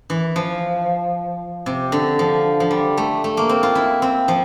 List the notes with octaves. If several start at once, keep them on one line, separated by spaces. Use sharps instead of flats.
E3
F3
C3
D3
F3
F3
G3
A3
A3
A#3
C4
F4
E4
C4
F3